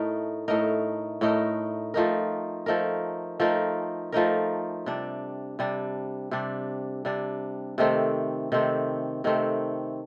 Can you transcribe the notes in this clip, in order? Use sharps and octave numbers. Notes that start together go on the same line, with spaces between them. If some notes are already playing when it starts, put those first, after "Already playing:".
Already playing: A2 A3 D#4 A#4
A2 A3 D#4 A#4
A2 A3 D#4 A#4
F3 A3 D#4 A#4
F3 A3 D#4 A#4
F3 A3 D#4 A#4
F3 A3 D#4 A#4
C3 G3 D4
C3 G3 D4
C3 G3 D4
C3 G3 D4
C3 D#3 A3 C4
C3 D#3 A3 C4
C3 D#3 A3 C4